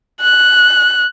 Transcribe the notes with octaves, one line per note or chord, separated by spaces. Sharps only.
F#6